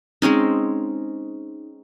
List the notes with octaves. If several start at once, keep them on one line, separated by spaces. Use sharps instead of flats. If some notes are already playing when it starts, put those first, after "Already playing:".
G#3 C4 C#4 D#4